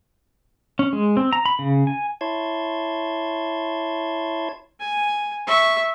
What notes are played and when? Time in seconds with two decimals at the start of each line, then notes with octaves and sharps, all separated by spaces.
0.79 C#4
0.93 G#3
1.17 C4
1.33 A#5
1.46 B5
1.59 C#3
1.87 G#5
2.21 E4 C#5 A5 C6 G#6
4.80 G#5
5.47 E5 C#6